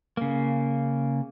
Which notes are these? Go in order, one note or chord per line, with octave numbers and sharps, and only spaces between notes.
C#3 A#3